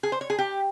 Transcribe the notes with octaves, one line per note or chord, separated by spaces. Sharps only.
G#4
C5
C#5
G#4
G4